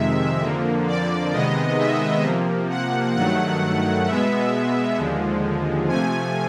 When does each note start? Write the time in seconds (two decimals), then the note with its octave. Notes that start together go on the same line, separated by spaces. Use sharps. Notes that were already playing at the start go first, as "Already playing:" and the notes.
Already playing: F2 C3 D#3 G#3 E5
0.42 F2 D3 F3 A#3
0.87 D5
1.33 C3 D#3 G#3 B3 D#5
1.79 E5
2.24 C3 F3 A#3
2.70 F#5
3.15 G2 D#3 F#3 A3 F#5
4.06 B2 G#3 B3 E5
4.97 D#2 D3 F3 G#3
5.88 C3 F3 A3 G#5